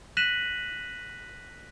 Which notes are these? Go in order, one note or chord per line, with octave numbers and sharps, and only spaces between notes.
F#6 A#6 B6 D#7 E7 F#7